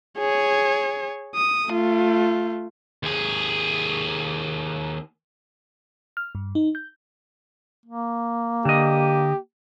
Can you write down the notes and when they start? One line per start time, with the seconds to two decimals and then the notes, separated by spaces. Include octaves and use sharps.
0.18 G#4 C#5
1.35 D#6
1.68 A3 F4
3.03 D#2 G#4
6.17 F6
6.35 G2
6.55 D#4
6.75 G6
7.86 A#3
8.65 D3 G4 D#5